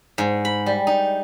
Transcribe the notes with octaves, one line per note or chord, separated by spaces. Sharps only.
G#2
B5
G3
D#4